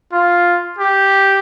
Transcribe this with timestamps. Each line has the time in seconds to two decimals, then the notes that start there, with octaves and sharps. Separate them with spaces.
0.12 F4
0.78 G4